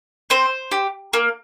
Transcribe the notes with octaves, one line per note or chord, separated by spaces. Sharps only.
C4 C5
G4
A#3